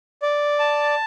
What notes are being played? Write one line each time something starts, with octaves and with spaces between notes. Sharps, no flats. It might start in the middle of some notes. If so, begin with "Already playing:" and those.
D5
A5